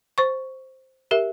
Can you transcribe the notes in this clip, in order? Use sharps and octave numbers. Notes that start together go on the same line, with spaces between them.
C5 C#6
G4 A#4 E5